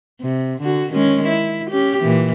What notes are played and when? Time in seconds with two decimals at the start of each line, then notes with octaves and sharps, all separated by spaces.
0.21 C3
0.62 D3 F#4
0.92 D#3 G#3 C#4
1.28 E4
1.71 C#4 G4
2.01 A#2 E3